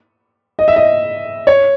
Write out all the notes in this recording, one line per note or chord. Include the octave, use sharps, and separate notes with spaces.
D#5
E5
D#5
C#5